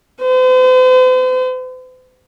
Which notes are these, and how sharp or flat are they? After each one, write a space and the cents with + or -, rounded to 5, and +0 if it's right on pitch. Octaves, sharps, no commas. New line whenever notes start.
C5 -45